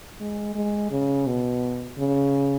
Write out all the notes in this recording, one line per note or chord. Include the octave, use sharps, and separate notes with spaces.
G#3
G#3
C#3
B2
C#3